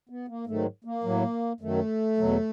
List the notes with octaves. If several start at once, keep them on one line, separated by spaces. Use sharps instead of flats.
B3
A#3
G#2 D#3 F#3 A3
A#3
A2 F#3
F#2 D#3 F#3 A3
E2 B2 F#3